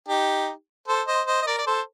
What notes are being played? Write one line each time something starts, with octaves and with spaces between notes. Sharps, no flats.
D#4 G4
A4 C5
C5 D#5
C5 D#5
D#5
A#4 D5
D5
A4 C5